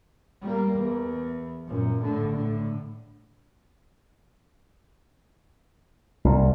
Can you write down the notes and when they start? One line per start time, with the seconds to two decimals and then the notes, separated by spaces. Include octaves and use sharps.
0.42 G3 A#3
0.75 E2
1.68 F#2 A#2
2.02 A2 D3
2.35 A2 D3
6.25 C2